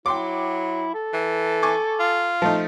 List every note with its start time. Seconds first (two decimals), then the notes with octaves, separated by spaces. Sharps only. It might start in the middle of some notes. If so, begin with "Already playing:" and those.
0.06 F#3 E4 G5 C6 D6
0.94 A4
1.13 E3
1.63 G#5 C#6 D6
2.00 F4
2.42 F3 A3 D#4